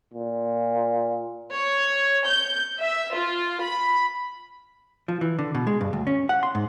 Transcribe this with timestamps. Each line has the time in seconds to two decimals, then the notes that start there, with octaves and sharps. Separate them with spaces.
0.14 A#2
1.54 C#5
2.26 G6
2.79 E5
3.14 F4
3.62 B5
5.08 F3
5.21 E3
5.39 D3
5.55 B2
5.67 G#3
5.81 G2
5.93 D2
6.07 C#4
6.29 F#5
6.43 C6
6.55 G#2